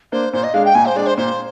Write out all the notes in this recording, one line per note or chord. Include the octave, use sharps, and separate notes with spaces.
A#3 D4 C5
A#2 C5
D#5
G#3 D4 F5
G5
A#2 G#5
C5
G#3 D4 D5
C5
A#2 C5